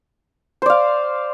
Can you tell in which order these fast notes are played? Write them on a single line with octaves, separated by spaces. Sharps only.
C5 D5 F5